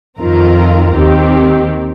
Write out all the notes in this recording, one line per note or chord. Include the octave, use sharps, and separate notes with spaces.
F2 D#3 C4 F4 A#4
D#2 D#3 C4 G4